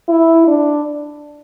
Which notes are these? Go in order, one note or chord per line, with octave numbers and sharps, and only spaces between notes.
E4
D4